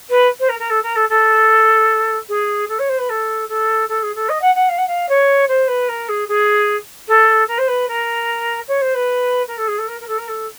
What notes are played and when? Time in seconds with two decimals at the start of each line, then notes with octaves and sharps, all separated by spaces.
0.09 B4
0.39 C5
0.49 A#4
0.59 A#4
0.70 A4
0.82 A#4
0.95 A4
1.09 A4
2.29 G#4
2.68 A4
2.79 C#5
2.89 C5
2.98 B4
3.09 A4
3.48 A4
3.88 A4
4.02 G#4
4.15 A4
4.29 D#5
4.41 F#5
4.55 F#5
4.68 F5
4.78 F#5
4.87 F5
5.09 C#5
5.48 C5
5.67 B4
5.88 A#4
6.08 G#4
6.28 G#4
7.07 A4
7.47 A#4
7.58 C5
7.68 B4
7.88 A#4
8.68 C#5
8.81 C5
8.94 B4
9.47 A#4
9.57 A4
9.67 G#4
9.78 A4
9.87 A#4
10.00 A#4
10.07 A4
10.18 A#4
10.28 A4